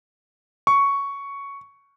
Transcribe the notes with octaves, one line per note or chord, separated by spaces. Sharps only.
C#6